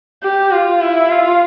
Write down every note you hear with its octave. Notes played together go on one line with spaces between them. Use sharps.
G4
F4
E4
F4